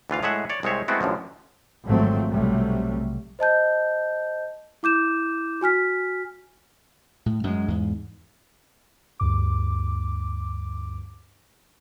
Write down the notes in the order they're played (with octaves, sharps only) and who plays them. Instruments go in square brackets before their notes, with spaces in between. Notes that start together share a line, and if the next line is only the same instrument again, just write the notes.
[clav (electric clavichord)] D2 E3 F4 F5
A2 G#3 G#4 E5 F#5
C#5 D5
C2 G#3 C4 C#5 E5
G#3 A3 B3 C4 E4 F#4
A1 F#2 D3 F3
[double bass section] G#1 F2 G#2 F#3 A3 C4
B1 C3 F#3 G3 A3
[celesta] C5 D#5 A5 G6
E4 D6 G6 E7
F#4 G#5 F6 B6
[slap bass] A2
F#2 G3 G#3
E2 G#2
[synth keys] D2 G2 D6